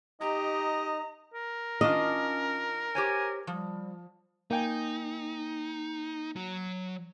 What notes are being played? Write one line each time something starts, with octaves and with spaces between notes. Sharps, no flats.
D#4 G4 D#5 A#5
A#4
D#3 C#4 D4 F4 D#5
G4 C5 C#5 G#5
F3 G3
A#3 D#4 G5 G#5
F#3 F#4